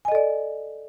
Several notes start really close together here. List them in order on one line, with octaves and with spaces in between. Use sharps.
G#5 D#5 A4 D5